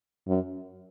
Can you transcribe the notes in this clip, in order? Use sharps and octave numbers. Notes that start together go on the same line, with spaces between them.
F#2